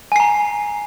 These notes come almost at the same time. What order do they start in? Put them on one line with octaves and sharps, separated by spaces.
G#5 C7 A#5